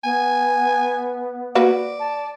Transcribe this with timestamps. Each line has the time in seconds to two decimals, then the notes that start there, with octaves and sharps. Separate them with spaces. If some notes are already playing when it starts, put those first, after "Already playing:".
0.04 B3 G#5
1.55 A#3 F#4 B4 D5
2.00 A5